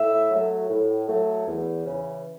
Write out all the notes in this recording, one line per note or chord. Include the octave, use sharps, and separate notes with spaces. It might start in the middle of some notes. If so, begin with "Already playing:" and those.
Already playing: A2 E5
F#3 A3
A2
F#3 A3
E2
C#3 E3